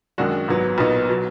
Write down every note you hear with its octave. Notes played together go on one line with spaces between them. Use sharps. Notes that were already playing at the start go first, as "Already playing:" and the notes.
F#2 D#3 G#3 D4 F#4
G#1 G#2 F#3 B3
B1 A#2 F#3 B3 D#4
B2 F#3